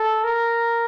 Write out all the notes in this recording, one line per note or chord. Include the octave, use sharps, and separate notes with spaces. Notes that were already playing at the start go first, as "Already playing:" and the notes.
Already playing: A4
A#4